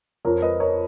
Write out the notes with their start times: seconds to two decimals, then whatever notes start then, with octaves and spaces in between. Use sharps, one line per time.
0.25 F2 F3 A#4 C#5
0.42 B4 D#5
0.60 A#4 C#5